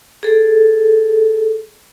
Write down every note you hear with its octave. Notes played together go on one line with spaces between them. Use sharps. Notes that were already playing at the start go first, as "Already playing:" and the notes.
G#4 A4